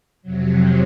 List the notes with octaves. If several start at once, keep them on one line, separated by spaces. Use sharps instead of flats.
F2 C3 F#3